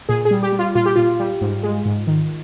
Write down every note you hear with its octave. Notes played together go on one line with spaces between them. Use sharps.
A#2 G#4
G#4
G3
G4
G3
F4
A#2 F4
G4
A#2 F4
G3
G#2
G#3
G#2
D#3